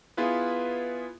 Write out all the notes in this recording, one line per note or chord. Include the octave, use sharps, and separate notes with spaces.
B3 E4 F4 G#4 B4